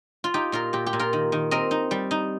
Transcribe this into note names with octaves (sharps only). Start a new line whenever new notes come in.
F4
D#4 G4
A#2 F4 A#4
A#2 G4
G4
A#2
F4 A#4
D#3
D#3
C4 A#4 D#5
D#4
G3
D#4